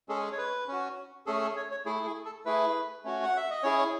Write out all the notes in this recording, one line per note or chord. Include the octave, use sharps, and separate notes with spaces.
G#3 C#4 G#4 A4
C#5
B4
C#4 F#4
A3 C#4 G#4 A4
A4
C#5
C#5
A3 E4 G#4
G#4
A4
A3 E4 G#4 B4
A3 C#4 F#4
F#5
E5
D#5
C#4 E4 G#4 C#5
C#5